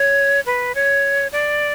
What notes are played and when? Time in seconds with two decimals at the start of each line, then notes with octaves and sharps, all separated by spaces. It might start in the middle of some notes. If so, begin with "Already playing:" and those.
Already playing: C#5
0.46 B4
0.75 C#5
1.32 D5